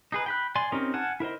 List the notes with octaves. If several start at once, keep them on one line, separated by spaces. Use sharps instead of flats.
D#4 G#4 B4
G5 B5 F#6
D5 G#5 C6
C4 C#4 D#4 G4 A#4
F#5 G#5 A5 F6 F#6
E4 A#4 C5 D#5